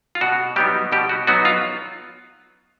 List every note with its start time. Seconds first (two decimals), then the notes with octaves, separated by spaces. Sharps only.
0.15 F4
0.21 B2 F#4
0.56 F#3 G3 B3 D#4 G4
0.92 B2 G3 G4
1.09 F#4
1.27 F#3 B3 D#4 F#4
1.45 F4